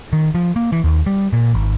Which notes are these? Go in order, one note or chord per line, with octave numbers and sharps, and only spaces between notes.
D#3
F3
A#3
E3
D#2
G3
A#2
G#1